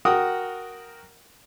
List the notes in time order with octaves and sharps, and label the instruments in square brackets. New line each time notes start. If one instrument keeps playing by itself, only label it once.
[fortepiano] F#4 A#4 F#5 G5 D#6